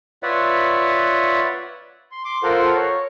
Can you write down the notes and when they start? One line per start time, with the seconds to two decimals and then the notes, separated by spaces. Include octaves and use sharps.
0.23 F4 B4 C#5 D5 E5 F#5
2.12 C6
2.25 C6 D6
2.43 F4 A4 A#4 C5 F5 F#5
2.75 C#5